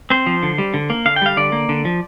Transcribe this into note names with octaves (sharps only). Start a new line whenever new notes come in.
C4 C5
F3
D3
G3
D3
A#3
D3 F5
G5
G3 F5
D3 D5
A#3
D3
F3